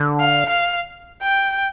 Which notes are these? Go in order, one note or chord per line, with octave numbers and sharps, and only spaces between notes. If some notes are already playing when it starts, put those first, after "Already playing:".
Already playing: D3
F5
F5
G5